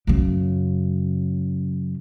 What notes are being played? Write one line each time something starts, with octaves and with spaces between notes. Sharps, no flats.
F#2 C#3